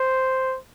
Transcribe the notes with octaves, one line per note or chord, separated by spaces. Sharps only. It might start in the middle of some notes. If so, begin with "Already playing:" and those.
Already playing: C5